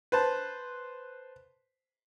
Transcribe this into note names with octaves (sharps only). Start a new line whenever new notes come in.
B4 C5 A5